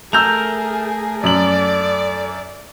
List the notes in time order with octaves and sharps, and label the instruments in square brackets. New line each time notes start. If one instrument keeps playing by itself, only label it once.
[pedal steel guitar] A3 A#4 [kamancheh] G#4 [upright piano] E6 G6 F7
[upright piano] F#2 F#7 [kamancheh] D5